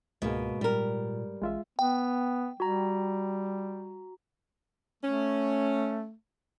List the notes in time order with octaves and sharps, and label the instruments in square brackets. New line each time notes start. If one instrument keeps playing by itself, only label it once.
[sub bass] C#2 [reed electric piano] G#2 G#3 [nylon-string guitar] B2 A#3
[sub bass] A#2 [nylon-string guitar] G3 A#4
[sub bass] A1 [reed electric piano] G#3 F4 E5
[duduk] B3 [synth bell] G5
[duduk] G3 [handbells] F#4 A#5
[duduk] A3 [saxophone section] C#4